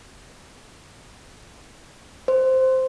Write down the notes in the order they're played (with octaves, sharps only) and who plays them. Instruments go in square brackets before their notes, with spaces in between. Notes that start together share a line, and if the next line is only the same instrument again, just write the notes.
[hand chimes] C5